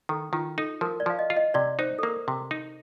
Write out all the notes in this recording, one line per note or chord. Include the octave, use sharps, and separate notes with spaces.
D#3 A4
D#3 F4
D#4 A4
F3 A#4
D5
F3 F5
D#5
F4
D#5
C3 D5
D#4 C5
A4
A#3 A#4
C3
D#4